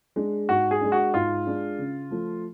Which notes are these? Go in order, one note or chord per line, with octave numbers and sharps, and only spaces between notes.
G#3 D4
G#2 F#4
G#4
G#3 D4
F#4
G#2 F4
G#3 D4
C#3
F3 A3